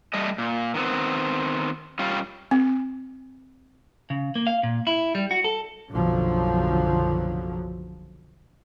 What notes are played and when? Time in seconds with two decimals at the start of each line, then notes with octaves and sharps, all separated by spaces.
0.14 G3 A3 D#5
0.38 A#2
0.74 D#3 B3 C4
1.99 G3 C#4 F4
2.51 C4
4.10 C#3
4.35 A#3
4.47 F5
4.63 A#2
4.87 E4
5.15 G3
5.31 F#4
5.44 A4
5.90 F#1 B1 D3 F3 F#3